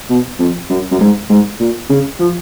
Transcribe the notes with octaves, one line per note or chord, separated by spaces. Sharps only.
B2
F2
F#2
F#2
G#2
G#2
A#2
C#3
F3